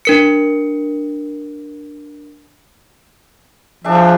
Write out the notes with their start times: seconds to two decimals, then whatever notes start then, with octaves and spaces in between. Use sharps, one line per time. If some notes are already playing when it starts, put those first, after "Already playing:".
0.05 D4 A#4 C#7
3.84 F3 D4 G#4 E5